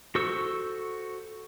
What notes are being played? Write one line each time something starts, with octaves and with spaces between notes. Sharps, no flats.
F#4 A4 C5 C#6 E6